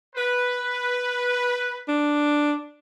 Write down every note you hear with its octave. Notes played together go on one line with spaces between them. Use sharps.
B4
D4